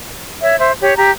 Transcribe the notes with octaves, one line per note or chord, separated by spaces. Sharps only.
C#5 E5
C5 E5
G4 C#5
G4 A#5